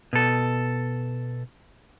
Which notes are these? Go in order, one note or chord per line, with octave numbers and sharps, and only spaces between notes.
B2 A4